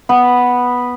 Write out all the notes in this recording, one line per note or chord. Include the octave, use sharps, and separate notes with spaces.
B3 B4